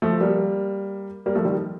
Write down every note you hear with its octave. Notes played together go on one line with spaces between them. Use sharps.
F3 A3
G3 A#3
G3 A#3
F3 A3
D#3 G3